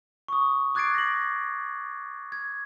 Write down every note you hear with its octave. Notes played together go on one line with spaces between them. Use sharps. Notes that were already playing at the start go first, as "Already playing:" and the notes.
C#6 D#6
D6 F#6 G#6 A6 C7 D7
A#6 F#7
G#6